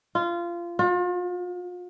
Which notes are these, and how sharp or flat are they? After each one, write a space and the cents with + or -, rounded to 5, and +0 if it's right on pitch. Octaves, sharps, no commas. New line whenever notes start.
F4 -20
F4 +40